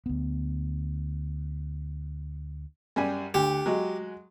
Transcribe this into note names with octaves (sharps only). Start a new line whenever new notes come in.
D2 B3
F#2 G3 G#5
D2 G4
F#3 G#3 F#4